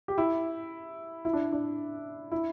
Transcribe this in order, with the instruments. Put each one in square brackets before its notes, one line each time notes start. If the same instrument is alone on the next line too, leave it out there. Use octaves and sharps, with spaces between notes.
[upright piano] G4
E4
E4
D4
D4
E4